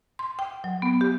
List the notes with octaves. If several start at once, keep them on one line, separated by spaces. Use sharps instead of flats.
C6
G5
F#3
B3
G4